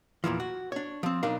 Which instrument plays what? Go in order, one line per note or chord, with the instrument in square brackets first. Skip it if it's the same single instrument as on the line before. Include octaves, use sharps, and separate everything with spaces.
[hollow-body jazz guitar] E2 A#2 E3 F3
F#4
D4 C#5
F3 C4
B1 D4 D#4 A#4 F5